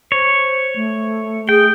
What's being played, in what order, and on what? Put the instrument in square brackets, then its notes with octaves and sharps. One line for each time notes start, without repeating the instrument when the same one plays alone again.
[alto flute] C5 [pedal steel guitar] C#5
[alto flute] A3
[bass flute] G#4 [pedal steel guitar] G5